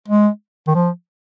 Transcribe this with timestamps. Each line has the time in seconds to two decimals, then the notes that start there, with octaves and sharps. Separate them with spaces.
0.08 G#3
0.67 D#3
0.75 F3